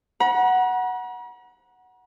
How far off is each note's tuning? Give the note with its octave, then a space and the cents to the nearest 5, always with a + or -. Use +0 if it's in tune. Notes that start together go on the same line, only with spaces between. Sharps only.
F#5 +0 A#5 +45